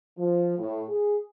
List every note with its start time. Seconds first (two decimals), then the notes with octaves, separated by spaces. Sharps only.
0.18 F3
0.58 A2
0.88 G#4